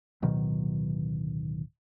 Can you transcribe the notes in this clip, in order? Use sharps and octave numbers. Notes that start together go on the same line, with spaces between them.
D1 B2 D#3 F#3